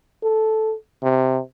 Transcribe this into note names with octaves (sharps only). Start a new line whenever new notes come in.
A4
C3